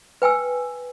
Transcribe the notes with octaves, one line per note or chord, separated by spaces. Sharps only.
B4 G5 G#5 E6